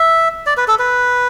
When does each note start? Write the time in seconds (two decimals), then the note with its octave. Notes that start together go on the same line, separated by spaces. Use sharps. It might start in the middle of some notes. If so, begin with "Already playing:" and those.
Already playing: E5
0.46 D5
0.57 B4
0.68 A4
0.79 B4